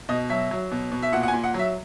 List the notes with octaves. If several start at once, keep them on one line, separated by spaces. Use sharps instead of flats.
B2 D#5
F#3 E5
F#3
B2
B2
E5
A#2 F#5
F#5
G#5
A#2
F#5
F#3 E5